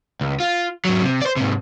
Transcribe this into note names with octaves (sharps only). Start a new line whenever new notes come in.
C#2
F4
G#2 F#3
C3
C5 D5
G#2 C3